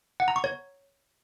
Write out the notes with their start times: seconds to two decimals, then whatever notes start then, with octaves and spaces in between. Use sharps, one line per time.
0.20 F#5
0.28 A#5
0.36 C#6
0.44 C#5